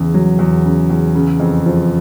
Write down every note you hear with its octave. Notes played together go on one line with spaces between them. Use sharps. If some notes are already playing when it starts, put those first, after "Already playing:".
Already playing: E2 C#3
F#3
E2
C#3
E2
C#3
F2
F3